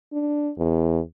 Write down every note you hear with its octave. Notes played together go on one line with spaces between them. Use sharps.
D4
E2